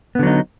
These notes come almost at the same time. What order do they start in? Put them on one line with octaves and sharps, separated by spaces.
B3 D3 F#3 D#4